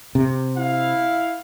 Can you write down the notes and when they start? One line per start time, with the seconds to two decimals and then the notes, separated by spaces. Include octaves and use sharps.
0.15 C3
0.58 E4 F5